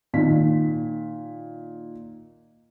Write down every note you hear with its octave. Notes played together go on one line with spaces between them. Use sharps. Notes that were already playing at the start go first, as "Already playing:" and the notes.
A#2 D#3 B6